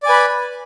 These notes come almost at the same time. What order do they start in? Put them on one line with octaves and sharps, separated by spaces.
D5 G#5 B4 B5